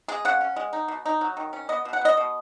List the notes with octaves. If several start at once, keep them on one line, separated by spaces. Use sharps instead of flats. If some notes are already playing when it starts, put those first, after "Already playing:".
G#3 G#4
C#3 F#5
C#4
G#3
D#4
B2
D#4
F#3
D#3
C#4
B3 D#5
B2
F#5
B3 D#5
B2